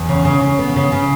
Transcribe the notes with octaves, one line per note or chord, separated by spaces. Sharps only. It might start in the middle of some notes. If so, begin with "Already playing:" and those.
Already playing: E2
C#3
C#3
C#3
B3
C#3
C#3